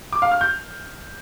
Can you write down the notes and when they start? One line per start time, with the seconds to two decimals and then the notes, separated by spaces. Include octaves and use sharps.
0.12 D6
0.22 F5
0.31 F6
0.41 G6